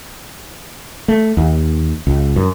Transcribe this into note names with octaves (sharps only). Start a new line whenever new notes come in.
A3
D#2
C#2
F#2